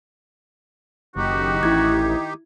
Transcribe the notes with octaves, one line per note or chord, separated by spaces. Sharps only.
F#1 D#3 D#4 F#4 G4
A1 E4 G#6